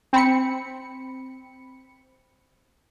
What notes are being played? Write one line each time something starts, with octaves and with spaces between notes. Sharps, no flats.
C4 B5 C#7